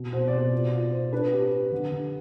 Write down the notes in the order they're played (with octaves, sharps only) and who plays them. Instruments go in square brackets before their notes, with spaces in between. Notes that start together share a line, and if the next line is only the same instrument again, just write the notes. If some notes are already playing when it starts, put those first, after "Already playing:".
Already playing: [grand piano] B2
[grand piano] B2 [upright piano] C5
[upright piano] D5
[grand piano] B2 [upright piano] C5
[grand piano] F4
F4
C5
[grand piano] D4 [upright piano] B4
[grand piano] G4
G4
D3
D3